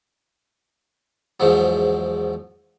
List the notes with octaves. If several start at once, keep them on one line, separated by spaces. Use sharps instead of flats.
E2 G#2 F3 F#3